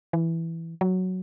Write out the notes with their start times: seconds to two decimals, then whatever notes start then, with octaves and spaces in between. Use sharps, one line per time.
0.13 E3
0.81 F#3